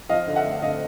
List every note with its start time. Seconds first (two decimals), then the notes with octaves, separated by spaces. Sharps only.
0.09 F3 D#5 F5
0.27 D3
0.36 E5 F#5
0.44 A3
0.62 D3 D#5 F5